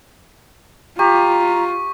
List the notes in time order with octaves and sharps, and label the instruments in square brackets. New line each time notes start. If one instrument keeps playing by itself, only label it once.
[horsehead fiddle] F4 [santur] G4 [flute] A#5 [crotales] C#6